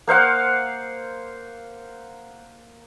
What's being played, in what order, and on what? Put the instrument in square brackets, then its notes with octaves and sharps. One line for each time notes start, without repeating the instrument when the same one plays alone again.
[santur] A#3 C5 F5 F#5